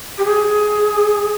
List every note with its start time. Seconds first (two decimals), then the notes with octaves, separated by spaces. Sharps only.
0.18 G4
0.25 G#4